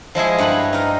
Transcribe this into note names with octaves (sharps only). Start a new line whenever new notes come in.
F3 G#3 E4 G#4
G2 B4 B5
D#4 A#4